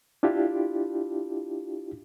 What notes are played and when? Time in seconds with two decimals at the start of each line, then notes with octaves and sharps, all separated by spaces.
0.23 D4 E4 F4 G4